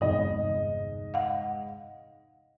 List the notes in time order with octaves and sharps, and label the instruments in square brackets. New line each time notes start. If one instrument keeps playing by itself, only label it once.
[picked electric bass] G1 E2 C3 [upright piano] G#2 D#5 [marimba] D#4
[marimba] F5 F#5